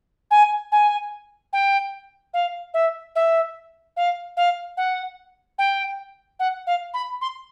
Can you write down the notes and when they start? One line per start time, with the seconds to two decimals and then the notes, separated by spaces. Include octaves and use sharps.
0.31 G#5
0.72 G#5
1.53 G5
2.34 F5
2.74 E5
3.15 E5
3.96 F5
4.37 F5
4.77 F#5
5.58 G5
6.39 F#5
6.67 F5
6.94 B5
7.21 C6